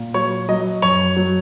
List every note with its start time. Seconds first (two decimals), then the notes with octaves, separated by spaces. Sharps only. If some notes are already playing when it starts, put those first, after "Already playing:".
Already playing: A#2
0.14 F#3 C#5
0.49 F#3 D#5
0.82 F#2 C#5
1.16 F#3